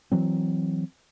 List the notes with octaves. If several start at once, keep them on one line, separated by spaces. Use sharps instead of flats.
E3 F#3 C4